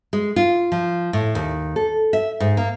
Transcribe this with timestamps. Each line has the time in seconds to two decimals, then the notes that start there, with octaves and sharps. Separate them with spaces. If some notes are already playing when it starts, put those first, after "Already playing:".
0.13 G#3
0.36 F4
0.72 F3
1.13 A2
1.35 D#2
1.76 A4
2.13 E5
2.40 G#2
2.57 A#3